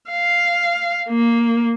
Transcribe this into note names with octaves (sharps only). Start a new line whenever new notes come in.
F5
A#3